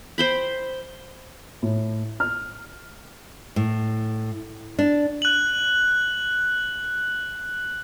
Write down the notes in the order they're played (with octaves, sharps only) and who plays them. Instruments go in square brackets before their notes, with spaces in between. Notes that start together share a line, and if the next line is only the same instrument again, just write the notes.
[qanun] C5 G5 B5
[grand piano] A2
F6
[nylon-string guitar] A2
D4
[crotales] F#6 F#7